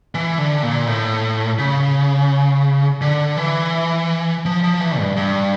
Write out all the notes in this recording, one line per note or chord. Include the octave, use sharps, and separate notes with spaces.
E3
D3
A#2
A2
C#3
D3
E3
F3
F3
E3
G2
G2